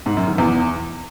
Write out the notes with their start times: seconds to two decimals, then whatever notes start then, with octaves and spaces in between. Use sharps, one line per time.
0.06 G#2
0.17 F#2
0.28 D#3
0.38 E2